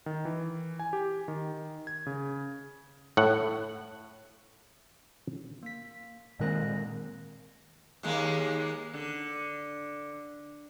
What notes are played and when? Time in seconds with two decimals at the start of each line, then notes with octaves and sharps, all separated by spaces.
0.06 D#3
0.25 E3
0.79 G#5
0.93 G4
1.28 D#3
1.87 G#6
2.06 C#3
3.17 A2 F#5
5.63 A#3 B6
6.39 A#2 D#3 G#3 A#3 C4 A#4 F#6 A#6
8.03 D#2 G#3 A#3
8.94 D3